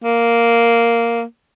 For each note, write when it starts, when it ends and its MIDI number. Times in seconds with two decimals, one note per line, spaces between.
0.04 1.22 58